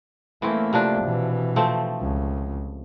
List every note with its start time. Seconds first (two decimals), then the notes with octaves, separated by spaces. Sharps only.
0.42 E3 A3 A#3 C4 C#4
0.73 C3 F3 D4
1.03 B2 E3
1.56 F3 A3 C4
2.00 C#2